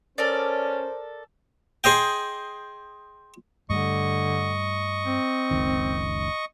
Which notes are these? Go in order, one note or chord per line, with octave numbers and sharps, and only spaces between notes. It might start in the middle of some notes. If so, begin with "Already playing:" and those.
C#4 A4 A#4 C5 D5
G#4 C5 D#5 G5
G2 D3 G3 A3 D#5 C#6
C4
F#1 C#2 D#3